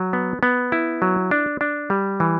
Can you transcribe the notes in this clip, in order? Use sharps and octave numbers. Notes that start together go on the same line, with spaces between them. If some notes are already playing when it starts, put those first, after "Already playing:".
Already playing: F#3
B3
B3
E4
F#3
D4
D4
G3
E3